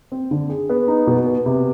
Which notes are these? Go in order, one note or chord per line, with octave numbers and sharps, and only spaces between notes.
C4
D3
G#4
B3
D#4
B2
B3
C3